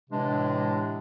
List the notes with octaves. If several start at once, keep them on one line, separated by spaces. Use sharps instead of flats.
A2 C3 E3 G#3 D4